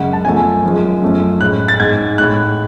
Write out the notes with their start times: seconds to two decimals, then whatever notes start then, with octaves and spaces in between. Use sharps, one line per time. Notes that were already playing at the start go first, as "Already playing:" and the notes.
Already playing: F#2 C#3 G#3 F#5
0.13 A5
0.25 F#2 F3 A3 G#5
0.63 F#2 F3 G#3
1.02 F#2 F3 A3
1.40 A2 G#3 F#6
1.68 A6
1.80 G#2 G#3 G#6
2.18 A2 G#3 F#6